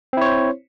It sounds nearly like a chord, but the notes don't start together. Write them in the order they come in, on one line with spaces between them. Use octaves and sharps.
C4 E4 C#5 C5